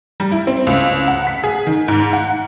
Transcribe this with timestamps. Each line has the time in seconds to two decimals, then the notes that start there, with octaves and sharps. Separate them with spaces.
0.20 G3
0.32 E4
0.47 C4
0.67 C#2
1.08 F#5
1.27 B6
1.44 G#4
1.67 D#3
1.88 G#2
2.13 F#5